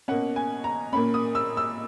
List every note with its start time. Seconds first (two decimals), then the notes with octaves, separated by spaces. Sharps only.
0.08 B2 A#3 C#4 F#5
0.36 G#5
0.64 A#5
0.93 A#2 A#3 C#4 B5
1.14 D#6
1.35 E6
1.57 E6